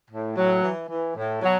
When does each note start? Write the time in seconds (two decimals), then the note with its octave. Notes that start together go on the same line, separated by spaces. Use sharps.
0.11 A2
0.37 A2 F#3
0.63 E3
0.89 E3
1.16 A2
1.42 B2 F#3